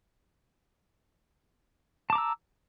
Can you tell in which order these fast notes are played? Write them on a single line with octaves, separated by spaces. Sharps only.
A5 D6 A#5 E6